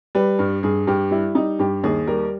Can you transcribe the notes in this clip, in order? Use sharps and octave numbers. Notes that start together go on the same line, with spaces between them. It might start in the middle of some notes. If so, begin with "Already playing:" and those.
G3 B4
G2
G2 G#4
G2 G4
G3 E4
G3 D#4
G2 G4
D#2 G#4
G3 A#4